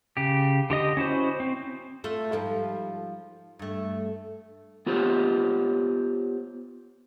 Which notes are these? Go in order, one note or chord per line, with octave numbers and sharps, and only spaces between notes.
C#3 G4
D3 G4 D#5 D#6
C#4 E4 F#4 C5
C4
A3 F4 A4
G#2 F3 G3
G2 A3
B3 F4 G4 C5 C#5